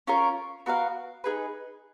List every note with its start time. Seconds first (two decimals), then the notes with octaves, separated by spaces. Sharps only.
0.07 C#4 F4 A#4 C#5
0.66 B3 F#4 A#4 F5
1.24 D#4 G#4 B4